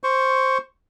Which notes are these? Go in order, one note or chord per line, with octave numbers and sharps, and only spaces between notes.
C5 C#6